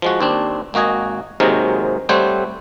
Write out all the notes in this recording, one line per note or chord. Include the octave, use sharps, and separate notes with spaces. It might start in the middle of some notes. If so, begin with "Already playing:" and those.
F3 G#3 F#4
D#2 C4 D4
G#1 A#3 F#4 D#5 G#5
D#2 G#2 C3 F#3 G#3 A#4
G3 A3 C4 C5 C#5 F#5